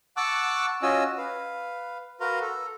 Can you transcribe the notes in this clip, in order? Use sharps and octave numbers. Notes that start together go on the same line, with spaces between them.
F#5 A5 C#6 D6 E6 F#6
C#4 F4 F#4 D#5 G#5 E6
B4 F5
F#4 A#4 B4 F5 A#5 C6
A4